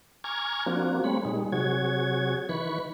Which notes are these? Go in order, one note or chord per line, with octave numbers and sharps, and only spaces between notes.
G#5 A#5 C#6 D6 F6 G#6
F3 A#3 C4 D4 F#4
G3 A3 C4 C#5 B5
A#2 G3 G#3 D#4
C3 F#3 F#4 G#4 C#5 G#6
D#3 E3 B4 B5 C#6